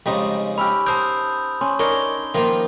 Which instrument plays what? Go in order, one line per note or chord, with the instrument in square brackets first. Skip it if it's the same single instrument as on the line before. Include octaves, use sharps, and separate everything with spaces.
[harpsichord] F2 C#3 G#3 [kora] G3 D#4
[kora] C#4 G4 [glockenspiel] B5 E6 F6
[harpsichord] A#4 C5 [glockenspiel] A5 D#6 G6
[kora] C#4 [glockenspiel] C6
[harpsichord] D4 [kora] D#4 A#4 C#5 [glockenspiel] G7
[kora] D#3 A#3 [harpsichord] F3 F4